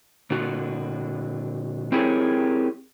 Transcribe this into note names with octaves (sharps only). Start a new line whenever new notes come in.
A#2 D3 F#4
C4 E4 G4 G#4 A#4 C#5